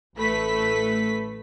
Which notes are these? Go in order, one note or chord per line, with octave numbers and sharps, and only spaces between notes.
A1 A3 B4 B6